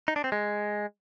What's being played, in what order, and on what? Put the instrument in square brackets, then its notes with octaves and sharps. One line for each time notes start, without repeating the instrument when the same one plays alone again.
[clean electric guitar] D#4
D4
C4
G#3